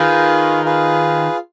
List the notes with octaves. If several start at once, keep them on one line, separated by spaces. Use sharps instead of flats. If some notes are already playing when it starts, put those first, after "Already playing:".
Already playing: D#3 F4 G#4 B4
F4 G#4 B4